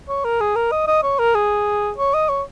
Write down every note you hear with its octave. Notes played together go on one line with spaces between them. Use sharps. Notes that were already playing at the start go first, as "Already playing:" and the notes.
C#5
A#4
G#4
A#4
D#5
D#5
C#5
A#4
G#4
C#5
D#5
C#5